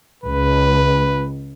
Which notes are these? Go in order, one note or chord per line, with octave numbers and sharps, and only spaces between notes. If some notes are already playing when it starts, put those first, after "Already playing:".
C#2 B4